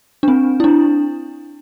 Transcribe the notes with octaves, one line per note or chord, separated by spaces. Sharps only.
D4
C4
E4
D4